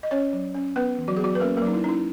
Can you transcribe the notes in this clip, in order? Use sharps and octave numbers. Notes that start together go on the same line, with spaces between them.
D#5
C#4 C#5
F#3
C#4
B3 B4
E3
F#3 F#4
G#4
F#3 B3 F#4
B4
A#3 C#4 A#4
A#3 A#4
F#3 D#4
E4
C#4 D#4
E4